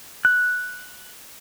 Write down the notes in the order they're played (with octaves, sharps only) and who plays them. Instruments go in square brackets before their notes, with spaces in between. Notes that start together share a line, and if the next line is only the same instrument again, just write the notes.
[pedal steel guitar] F#6